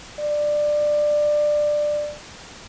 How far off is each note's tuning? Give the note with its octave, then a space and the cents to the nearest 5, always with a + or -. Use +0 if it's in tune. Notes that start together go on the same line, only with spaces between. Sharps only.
D5 +15